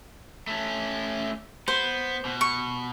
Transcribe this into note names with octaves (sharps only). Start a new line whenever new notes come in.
A3 C#4
B3 C5
B2
C#6